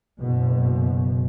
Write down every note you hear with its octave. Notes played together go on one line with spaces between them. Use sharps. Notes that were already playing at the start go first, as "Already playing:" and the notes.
F#1 B2